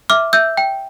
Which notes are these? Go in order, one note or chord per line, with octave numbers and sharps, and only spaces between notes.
E5 D6 F6
E5 E6 G6
G5